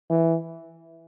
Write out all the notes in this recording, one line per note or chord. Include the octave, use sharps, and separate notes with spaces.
E3